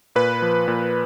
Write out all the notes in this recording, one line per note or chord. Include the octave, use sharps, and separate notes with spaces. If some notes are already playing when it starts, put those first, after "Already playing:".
A#2 B4
F3
A#2